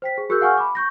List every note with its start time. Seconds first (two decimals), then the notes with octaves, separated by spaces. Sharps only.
0.02 C5 G5 B6
0.18 G#4
0.29 F#4 G#4 A#4 E6 F#6 G6
0.41 F5 F#5 G#5 C#6 F6 G6
0.58 B5 D6
0.75 C#6 G6 A#6